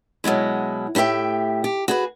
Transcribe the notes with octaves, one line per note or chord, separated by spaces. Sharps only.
B2 F#3 G#3 E4
A2 G4 C5 E5 G5
G4
F#4 G#4 B4